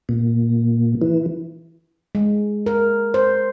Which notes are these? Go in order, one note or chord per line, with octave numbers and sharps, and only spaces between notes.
A#2
E3
G#3
A#4
C5